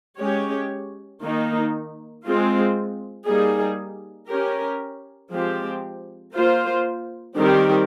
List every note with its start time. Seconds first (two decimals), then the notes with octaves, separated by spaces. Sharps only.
0.19 G#3 C#4 G4 C#5
1.22 D#3 A#3 D#4
2.24 G#3 C4 F4
3.27 G3 A#3 D#4 G#4
4.29 C#4 G4 A#4
5.32 F3 G#3 C4 G4
6.34 A#3 F4 C5
7.37 D#3 G3 C4 G4 A#4